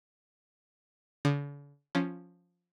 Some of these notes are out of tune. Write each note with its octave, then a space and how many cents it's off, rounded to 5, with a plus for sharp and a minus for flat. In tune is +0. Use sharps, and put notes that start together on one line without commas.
D3 -45 D#6 -45
F3 +10 C#4 +0 F4 +0